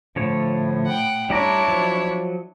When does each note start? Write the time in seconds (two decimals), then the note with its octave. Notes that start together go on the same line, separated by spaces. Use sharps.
0.16 A2 D3 F3 C#5
0.86 F#5 G5
1.30 G3 D4 E4 C#5 D5 A#5
1.68 F3 F#3